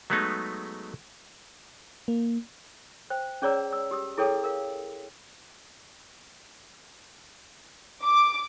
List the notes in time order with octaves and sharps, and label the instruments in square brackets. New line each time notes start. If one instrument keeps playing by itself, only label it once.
[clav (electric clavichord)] F#3 G#3 A3 B3 D#4
[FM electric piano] A#3
[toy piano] C5 G5
C#4 G#4 C#5 D5 A#5 E6
E6
G4 D#6 E6
E4 G#4 A4 C#5 G5 D#6
A#4 F5
[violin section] D6